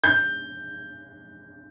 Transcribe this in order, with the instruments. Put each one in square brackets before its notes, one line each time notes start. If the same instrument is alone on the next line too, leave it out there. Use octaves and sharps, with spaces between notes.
[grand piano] G6